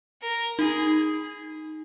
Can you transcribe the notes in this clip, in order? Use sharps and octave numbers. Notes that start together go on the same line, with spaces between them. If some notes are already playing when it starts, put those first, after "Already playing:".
A#4
D#4 G#4